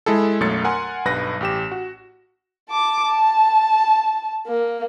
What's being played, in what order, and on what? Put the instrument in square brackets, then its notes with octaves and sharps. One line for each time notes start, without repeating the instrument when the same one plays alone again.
[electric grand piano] G#3 E4 G#4 A4
B1 F#2 A3 C#5 A6 C#7
A#4 F#5 G#5 C6
B1 G2 B4 A#6
A1 G4 E7
F#4
[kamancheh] A5 D6
A5
A#3